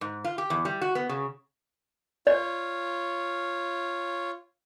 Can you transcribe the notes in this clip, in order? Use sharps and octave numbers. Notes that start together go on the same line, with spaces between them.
G#2
F4
G4
E2
G3
F#4
B3
C#3
F4 C#5 D5